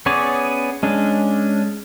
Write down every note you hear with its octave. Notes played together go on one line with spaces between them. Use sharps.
B3 C#4 G#4 C#5 D5
G#3 C#4 D4